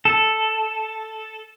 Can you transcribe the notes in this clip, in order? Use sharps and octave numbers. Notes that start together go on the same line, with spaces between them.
A4